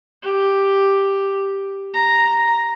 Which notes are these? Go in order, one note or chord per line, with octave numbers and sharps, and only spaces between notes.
G4
A#5